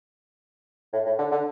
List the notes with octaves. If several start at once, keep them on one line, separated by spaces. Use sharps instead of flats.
A2
A2
D3
D3